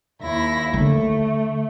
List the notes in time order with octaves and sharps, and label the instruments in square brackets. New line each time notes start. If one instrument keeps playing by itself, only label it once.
[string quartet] D#2 E4 A#6
[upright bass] D3 [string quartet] A3